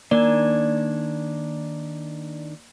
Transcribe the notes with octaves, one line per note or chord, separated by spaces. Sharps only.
D#3 A#3 D4 D5 G#5